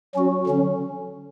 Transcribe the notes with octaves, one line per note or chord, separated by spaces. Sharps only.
F#3 C#4 F#4
D3 F#3 C#4